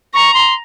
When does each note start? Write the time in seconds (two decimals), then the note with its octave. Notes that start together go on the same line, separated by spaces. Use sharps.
0.14 A#5 C#6
0.34 C6